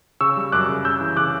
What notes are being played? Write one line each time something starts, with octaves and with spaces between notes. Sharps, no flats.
C#3 C#6 E6
G3
F#2 D6 F#6
C#3
C#3 E6 G6
E3
C#3 D6 F#6